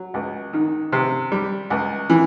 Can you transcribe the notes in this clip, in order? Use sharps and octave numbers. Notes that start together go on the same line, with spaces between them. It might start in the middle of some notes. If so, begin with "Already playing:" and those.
Already playing: F#3
C#2
D#3
C3
G3
C#2
E3